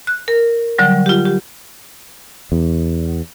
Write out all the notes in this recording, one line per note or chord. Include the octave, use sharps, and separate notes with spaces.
F#6
A#4
D3 F#3 G3
F4 G4
G4
E2